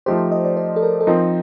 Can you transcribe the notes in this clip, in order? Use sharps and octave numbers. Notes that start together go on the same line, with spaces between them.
F3 A3 D#4 G4 C5
D#5
D5
C5
A4
A#4
A4
F3 C4 D#4 A#4